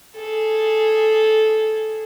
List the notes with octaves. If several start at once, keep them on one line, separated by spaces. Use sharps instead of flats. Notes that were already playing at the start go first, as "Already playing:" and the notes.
G#4 A4